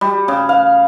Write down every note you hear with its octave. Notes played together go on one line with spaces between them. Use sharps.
G3
C#3
F5